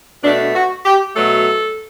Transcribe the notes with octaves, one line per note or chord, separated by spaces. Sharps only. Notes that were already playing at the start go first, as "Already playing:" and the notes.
B2 A3 D4
F#4
G4
B2 F#3 A3 A4